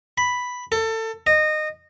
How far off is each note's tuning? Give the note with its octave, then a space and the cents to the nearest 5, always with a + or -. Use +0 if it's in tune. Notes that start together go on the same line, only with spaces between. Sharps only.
B5 +0
A4 +25
D#5 -20